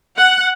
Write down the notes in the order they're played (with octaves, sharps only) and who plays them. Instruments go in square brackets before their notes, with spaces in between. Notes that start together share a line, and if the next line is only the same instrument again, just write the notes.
[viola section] F#5